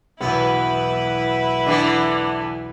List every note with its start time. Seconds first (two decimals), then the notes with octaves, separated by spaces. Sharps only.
0.21 B1 E2 B3 E4 B4
1.66 D3 E3 B3